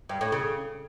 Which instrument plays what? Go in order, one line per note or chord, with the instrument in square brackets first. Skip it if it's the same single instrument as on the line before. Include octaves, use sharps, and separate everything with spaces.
[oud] G2
A2
C#3